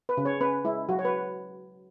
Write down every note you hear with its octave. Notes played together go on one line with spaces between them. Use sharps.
B4
C#3
C#5
C#4 B4
G#3 E4
F#3 F#4
C#5
B4